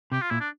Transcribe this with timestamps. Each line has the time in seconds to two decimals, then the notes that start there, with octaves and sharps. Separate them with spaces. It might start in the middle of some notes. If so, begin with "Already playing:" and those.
0.12 C3 G4
0.22 F4
0.31 A#2 E4
0.40 D4